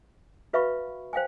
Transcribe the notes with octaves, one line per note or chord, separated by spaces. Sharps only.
F#4 B4 E5 F5 B5 C#6
C5 F5 G5 G#5